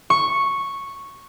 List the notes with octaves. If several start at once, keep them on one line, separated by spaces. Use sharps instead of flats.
C#6